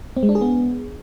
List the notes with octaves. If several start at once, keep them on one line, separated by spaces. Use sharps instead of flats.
C4
G#3
D4
G#4
B3